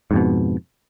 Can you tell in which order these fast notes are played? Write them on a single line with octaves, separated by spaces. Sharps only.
G#2 F2 B2